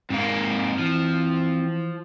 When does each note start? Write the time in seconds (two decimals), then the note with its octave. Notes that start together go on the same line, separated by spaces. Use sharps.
0.10 G#2 A#3 C4 F5
0.78 E3 F3